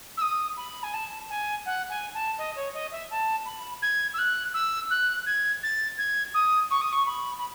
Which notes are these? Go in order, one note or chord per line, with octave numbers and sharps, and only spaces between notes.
E6
D#6
B5
G#5
A5
G#5
F#5
G#5
A5
D#5
C#5
D#5
E5
A5
B5
G#6
E6
F#6
E6
F#6
G#6
A6
G#6
D#6
C#6
D#6
C#6
B5
B5